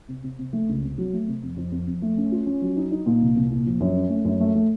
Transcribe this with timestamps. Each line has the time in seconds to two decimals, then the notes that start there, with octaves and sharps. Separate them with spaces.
0.08 C3
0.23 C3
0.39 C3
0.53 A3
0.69 C#2
0.84 C3
0.98 F#3
1.13 A3
1.28 C3
1.43 F2
1.57 F2
1.72 F2
1.87 F2
2.02 A3
2.17 C#4
2.32 F4
2.46 C#4
2.62 F#3
2.76 D#4
2.91 D#4
3.06 A#2
3.22 C2
3.36 C2
3.50 A#2
3.66 F3
3.80 F#2
3.96 C#4
4.10 A3
4.25 F#2
4.40 A3
4.55 A3